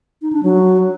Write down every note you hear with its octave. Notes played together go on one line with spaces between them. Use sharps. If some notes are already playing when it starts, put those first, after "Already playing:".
D#4
D4
F#3